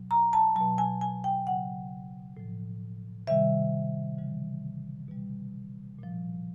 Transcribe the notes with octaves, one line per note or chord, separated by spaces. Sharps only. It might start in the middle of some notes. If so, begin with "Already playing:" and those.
Already playing: B2 F#3
A#5
A5
B2 F#3 A5
G#5
G#5
G5
C#3 F#3 F#5
A2 F3
C3 D#3 G3 E5
C#3 E3 G3
B2 G3
A#2 F3